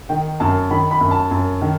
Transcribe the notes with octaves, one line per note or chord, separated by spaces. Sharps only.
D#3 G5
F#2 A5
D#3 B5
B5
F#2
A5
F#2
D#3